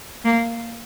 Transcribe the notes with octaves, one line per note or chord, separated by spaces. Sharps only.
A#3